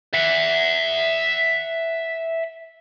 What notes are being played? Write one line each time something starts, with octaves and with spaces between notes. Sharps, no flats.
E5 F#5